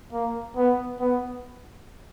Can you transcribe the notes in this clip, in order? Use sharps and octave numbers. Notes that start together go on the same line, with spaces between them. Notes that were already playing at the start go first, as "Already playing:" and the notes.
A#3
B3
B3